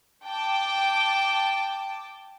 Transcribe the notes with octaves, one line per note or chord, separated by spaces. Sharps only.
G5 A5 D6